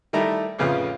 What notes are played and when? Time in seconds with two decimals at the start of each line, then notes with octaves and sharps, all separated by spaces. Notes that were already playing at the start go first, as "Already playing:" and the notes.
0.13 D#3 G3 A3 E4 A#5
0.59 A1 F2 C#3 B3 F4